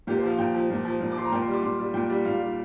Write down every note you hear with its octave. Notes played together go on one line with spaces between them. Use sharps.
A#2 G4
C5
F3 F5
A#2 G5
F3
A#2
F3
A#2
D6
F3 C6
A#5
A#2 G5
C6
G3
D6
A#2 C6
G3
A#2 G5
G3
A#2 F5
G3